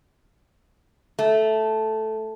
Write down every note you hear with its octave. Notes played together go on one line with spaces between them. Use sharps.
A3